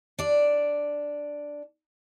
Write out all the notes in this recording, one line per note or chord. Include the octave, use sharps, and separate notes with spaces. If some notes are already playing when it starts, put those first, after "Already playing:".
D4 D5